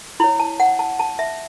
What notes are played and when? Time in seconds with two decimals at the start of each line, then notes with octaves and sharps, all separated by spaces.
0.20 E4 C#5 B5
0.39 A5
0.60 F#5
0.79 A5
1.00 A5
1.19 E5